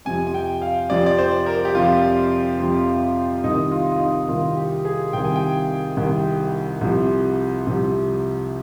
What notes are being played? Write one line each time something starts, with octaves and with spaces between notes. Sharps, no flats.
F2 C3 F3 G#5
G#5
G5
F5
F2 C3 F3 D5
D5
C5
A#4
G4
F2 C3 F3 F4
F2 C3 F3
C2 C3 D#3 D#4
F4
F4
D#4
C2 C3 D#3 F4
G4
G#4
C2 C3 D#3 G5
G#5
G5
C2 C3 D#3
C2 C3 F3
C2 C3 F3